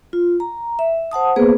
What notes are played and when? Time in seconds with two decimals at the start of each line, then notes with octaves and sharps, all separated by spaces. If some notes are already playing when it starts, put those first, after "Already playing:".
0.13 F4
0.40 A#5
0.79 E5
1.11 C5 F#5 A5 D#6
1.36 A#3 B3 G#4 B4 C5